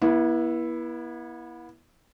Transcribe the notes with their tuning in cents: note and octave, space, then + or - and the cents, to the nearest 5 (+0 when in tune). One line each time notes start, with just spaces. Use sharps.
B3 -40 E4 +0